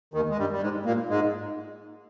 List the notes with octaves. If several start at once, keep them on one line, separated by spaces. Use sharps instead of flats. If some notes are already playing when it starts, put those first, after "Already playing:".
D#2 D#3
G#3
G2 G3
G3
G#2 G#3
A#2 A#3
G#2 G#3